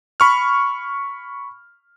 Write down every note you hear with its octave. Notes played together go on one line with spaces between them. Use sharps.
B5 C#6 F6